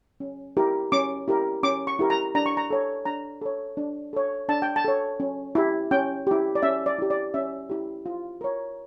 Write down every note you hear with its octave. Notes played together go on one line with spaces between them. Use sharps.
C#4
E4 G4 A#4
C#4 D6
E4 G4 A#4
C#4 D6
C#6
E4 G4 A#4
A#5
D4 A#5
C#6
A#5
A4 C#5
D4 A#5
A4 C#5
D4
A4 C#5
D4 A5
G5
A5
A4 C#5
C#4
E4 G4
C#4 G5
E4 G4
D5
C#4 E5
D5
E4 G4
D5
C#4 E5
E4 G4
F4
A#4 C#5